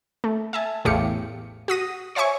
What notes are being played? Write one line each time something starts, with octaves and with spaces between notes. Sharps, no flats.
A3
E5 G#5 A5
A1 E2 A2 G4 F5 C#7
F#4 D#6 A#6 D#7
C5 C#5 E5 G#5 C#6